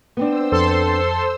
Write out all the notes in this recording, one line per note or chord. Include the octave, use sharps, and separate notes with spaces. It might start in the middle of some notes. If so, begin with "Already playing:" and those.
B3 C4 D4 C5 E6
F2 A4 C6